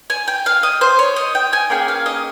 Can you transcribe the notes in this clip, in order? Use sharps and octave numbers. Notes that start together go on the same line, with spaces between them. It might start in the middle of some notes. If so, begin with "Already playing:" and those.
G#5
G5
F5
D#5
C5
C#5
D#5
G5
G#5
A#3 C#4 G#4 G5
F5
D#5